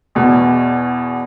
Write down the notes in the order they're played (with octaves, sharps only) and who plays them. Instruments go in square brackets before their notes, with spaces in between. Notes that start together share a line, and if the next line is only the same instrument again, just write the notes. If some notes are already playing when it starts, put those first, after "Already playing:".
[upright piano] E2 B2